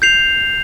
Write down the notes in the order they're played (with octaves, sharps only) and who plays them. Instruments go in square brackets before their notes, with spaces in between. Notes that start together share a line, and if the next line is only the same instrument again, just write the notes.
[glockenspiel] G6 C7 F7